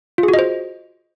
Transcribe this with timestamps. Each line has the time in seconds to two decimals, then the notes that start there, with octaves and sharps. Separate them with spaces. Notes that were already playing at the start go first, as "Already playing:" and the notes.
0.18 F4
0.23 G#4
0.28 F#4
0.34 D#5
0.39 C5